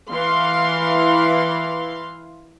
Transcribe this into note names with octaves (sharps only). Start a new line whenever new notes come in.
E3 F5 C6